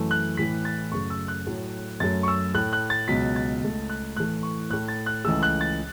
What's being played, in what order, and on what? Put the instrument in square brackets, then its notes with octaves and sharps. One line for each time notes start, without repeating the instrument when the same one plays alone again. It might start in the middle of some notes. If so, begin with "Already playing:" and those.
Already playing: [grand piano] F#2 E3 A3
F#6
A2 E3 A3 B6
A6
F#2 C#3 A3 C#6
E6
F#6
A2 F#3 A3
F#2 F#3 A3 A6
C#6
E6
A2 A3 F#6
F#6
A6
C#2 B2 F#3 B6
A6
C#2 C#3 A3
F#6
A2 E3 A3 F#6
C#6
A2 A3 F#6
A6
F#6
C#2 C#3 E3 A3 E6
F#6
A6